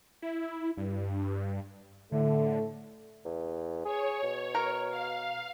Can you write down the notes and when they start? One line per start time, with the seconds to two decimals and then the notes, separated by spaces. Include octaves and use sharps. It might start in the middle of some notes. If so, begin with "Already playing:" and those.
0.22 E4
0.77 G2
2.12 A2 D3 A3
3.25 E2
3.85 G#4 C#5
4.23 B2
4.55 A#4
4.90 F5